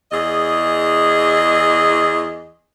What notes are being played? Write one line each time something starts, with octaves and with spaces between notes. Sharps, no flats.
E2 G#4 D#5